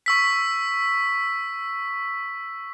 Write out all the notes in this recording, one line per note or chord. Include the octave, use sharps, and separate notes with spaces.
C#6 E6 B6